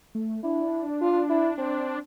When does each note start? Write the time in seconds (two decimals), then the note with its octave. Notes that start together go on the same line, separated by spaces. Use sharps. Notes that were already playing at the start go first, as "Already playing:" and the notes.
0.15 A3
0.44 D4 E4
1.01 F4
1.30 E4
1.59 C4